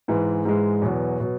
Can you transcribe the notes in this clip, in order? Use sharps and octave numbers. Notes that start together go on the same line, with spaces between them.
G#2 E3 G#3
G#2 E3 G#3
E2 B2 F#3
B2 F#3